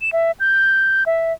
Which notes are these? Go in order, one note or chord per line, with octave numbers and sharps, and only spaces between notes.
E7
E5
G6
E5